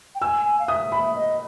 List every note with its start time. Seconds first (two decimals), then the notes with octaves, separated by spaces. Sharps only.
0.15 G5
0.22 G#5 E6
0.45 G#5
0.59 F5
0.68 E5 D#6
0.92 B5
1.15 D#5